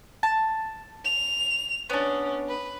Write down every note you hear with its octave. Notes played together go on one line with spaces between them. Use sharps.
A5
F7
B3 C#4 D4
B4